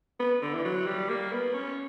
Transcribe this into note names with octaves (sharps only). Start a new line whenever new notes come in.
B3
D3
E3
F#3
G3
A#3
B3
C#4